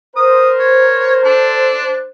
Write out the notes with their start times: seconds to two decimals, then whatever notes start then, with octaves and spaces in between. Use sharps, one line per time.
0.16 A#4 C5 D#6
0.60 C#5
1.25 D4 A4